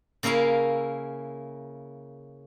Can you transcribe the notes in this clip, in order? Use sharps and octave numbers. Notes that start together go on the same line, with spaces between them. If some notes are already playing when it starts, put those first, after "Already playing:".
C#3 A#3 C#4 E4 F5